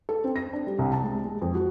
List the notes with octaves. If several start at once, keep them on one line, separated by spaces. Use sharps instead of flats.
A4
C4
A#6
D4
G3
C2
A5
G#3
G#3
F2
F#4